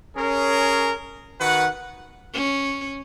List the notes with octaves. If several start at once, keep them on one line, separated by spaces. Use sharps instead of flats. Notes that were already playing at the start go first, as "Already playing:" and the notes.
C#4 G#4 A#4
D#3 F#4 B4 F#5
C#4